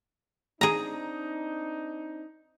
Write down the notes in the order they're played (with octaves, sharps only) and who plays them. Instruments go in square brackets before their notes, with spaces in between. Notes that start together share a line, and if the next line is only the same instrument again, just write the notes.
[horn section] C4 D4 D#4 [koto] G#4 A#5